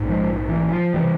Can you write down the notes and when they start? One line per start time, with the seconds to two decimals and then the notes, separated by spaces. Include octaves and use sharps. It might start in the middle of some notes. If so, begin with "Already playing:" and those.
Already playing: A#1 G#2
0.09 F3 G#3
0.49 E3
0.72 F3
0.94 C3 E3 G3